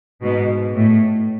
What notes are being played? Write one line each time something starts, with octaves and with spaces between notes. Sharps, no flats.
G#2 B2
A2